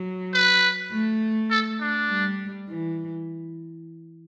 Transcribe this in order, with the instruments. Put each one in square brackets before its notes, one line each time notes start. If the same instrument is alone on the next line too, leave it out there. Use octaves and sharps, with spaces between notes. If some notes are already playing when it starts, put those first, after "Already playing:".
Already playing: [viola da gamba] F#3
[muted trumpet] B4
[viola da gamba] A3
[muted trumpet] A4
D4
[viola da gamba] G3
E3